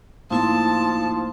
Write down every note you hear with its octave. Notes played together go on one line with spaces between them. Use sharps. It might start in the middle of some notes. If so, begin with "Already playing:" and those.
A2 F3 A#3 D#4 E4 A5 C6